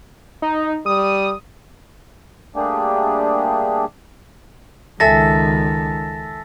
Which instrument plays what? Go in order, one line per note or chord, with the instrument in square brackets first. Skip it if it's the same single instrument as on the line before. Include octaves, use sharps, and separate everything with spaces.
[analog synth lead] D#4
[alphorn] G3 [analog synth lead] D#6
[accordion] G3 A3 A#3 D4 G4 G#4
[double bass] C#2 D#3 [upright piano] A4 E5 G#5 [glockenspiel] A5 A6 A#6